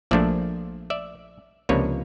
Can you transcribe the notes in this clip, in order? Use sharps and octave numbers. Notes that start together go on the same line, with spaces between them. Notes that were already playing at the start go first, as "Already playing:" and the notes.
A#1 A#2 F3 A3 D4 D5 E5
D5 E5
C#2 C3 F3 A#3 D4 B4 C#5